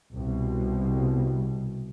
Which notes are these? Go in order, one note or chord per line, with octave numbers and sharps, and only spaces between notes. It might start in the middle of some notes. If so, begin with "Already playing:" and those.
C2 B2